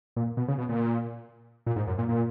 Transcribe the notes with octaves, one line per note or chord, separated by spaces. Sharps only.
A#2
B2
C#3
B2
A#2
A#2
G#2
F#2
A#2
A#2